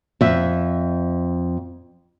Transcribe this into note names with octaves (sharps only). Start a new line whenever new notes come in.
F2 E5